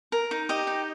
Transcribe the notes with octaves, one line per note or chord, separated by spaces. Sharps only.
A#4
D#4
G4 D#5
D#4